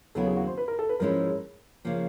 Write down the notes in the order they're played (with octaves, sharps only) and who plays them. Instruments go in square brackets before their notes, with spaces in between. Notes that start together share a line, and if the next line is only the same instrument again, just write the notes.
[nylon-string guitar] D#2 C#3 F#3 B3 E4 [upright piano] A4
[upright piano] G#4
F#4
C5
B4
A#4
A4
B4
[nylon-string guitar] G#2 F3 G#3 C#4 E4 [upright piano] A#4
[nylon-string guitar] C#3 F3 A#3